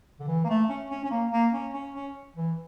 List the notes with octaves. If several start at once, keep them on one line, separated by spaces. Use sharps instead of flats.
D3
E3
A#3
A3
C#4
C#4
C#4
A#3
A#3
C#4
C#4
C#4
E3